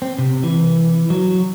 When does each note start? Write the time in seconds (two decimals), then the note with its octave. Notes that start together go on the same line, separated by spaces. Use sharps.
0.02 C4
0.19 C3
0.43 E3
1.10 F#3